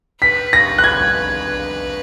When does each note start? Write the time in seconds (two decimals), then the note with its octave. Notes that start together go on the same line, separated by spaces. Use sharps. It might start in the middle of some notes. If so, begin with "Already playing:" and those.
0.22 B4 B6
0.53 A#6
0.78 F#6
0.84 G#6